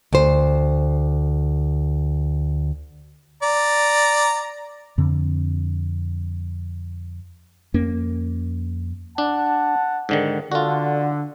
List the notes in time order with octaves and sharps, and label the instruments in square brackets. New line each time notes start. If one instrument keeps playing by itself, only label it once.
[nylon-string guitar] D2 C5
[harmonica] D5 A#5
[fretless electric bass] F2 D3 C4
F2 A#3 C#4
[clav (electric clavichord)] D4 [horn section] F#5 A5
[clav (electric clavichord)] G#2 D3 D#3
[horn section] D3 [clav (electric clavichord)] F4 F#4